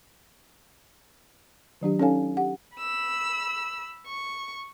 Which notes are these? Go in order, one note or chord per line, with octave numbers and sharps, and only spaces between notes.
D#3 F#3 D4 G4
C#4 D#4 A4 C#5 F5 G#5
G4 F#5
B5 E6
C#6